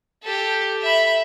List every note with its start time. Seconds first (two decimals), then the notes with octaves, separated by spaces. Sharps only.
0.23 G4 A4
0.82 E5 B5